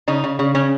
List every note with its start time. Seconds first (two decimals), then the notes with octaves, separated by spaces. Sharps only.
0.08 C#3 D#4
0.24 C#3
0.39 C#3
0.55 C#3 C#4